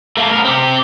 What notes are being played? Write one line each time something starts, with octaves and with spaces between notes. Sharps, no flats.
A3 A#3
B3 A#4
C4 G4